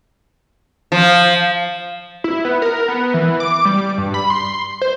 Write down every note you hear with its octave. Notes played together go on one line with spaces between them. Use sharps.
F3
E4
B3
A#4
B3
E3
D6
G3
G2
B5
C6
C5